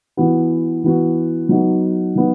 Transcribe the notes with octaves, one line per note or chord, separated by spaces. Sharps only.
E3 B3 F#4
E3 B3 F#4
F#3 B3 D#4 F#4
F#3 B3 D#4